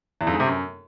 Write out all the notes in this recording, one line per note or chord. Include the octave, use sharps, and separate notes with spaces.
E2
F2
G#2
C3
F#2